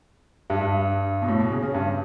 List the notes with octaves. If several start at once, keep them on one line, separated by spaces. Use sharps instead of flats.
G2
G2
B2
A2
B2
C#3
C#3
G2